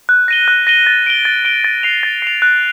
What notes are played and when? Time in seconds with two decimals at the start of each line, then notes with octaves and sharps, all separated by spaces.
0.09 F#6
0.28 A#6 D#7 G7
0.48 F#6
0.67 A#6 D#7 G7
0.87 A6
1.06 D7 G7
1.25 A6
1.45 D7 G7
1.64 A6
1.83 C7 F7
2.03 A6
2.22 C7 F7
2.42 F#6